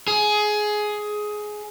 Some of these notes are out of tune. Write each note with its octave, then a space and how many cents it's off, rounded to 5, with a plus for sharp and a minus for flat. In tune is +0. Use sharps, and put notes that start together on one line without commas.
G#4 +15